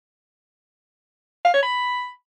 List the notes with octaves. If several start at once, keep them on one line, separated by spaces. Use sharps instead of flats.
F5
C#5
B5